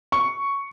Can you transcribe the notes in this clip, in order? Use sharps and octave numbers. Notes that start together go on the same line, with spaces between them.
C#6